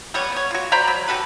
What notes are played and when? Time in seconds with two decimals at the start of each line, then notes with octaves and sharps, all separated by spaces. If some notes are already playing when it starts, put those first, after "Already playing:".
0.14 G3 B3 C#5
0.32 B3 C#5
0.51 F4 F#4
0.72 C5 D5 A#5 B5
0.87 F#3
1.08 F#4 G4 A4 B4